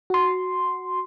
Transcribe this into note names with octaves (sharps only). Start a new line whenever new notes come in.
F#4 C6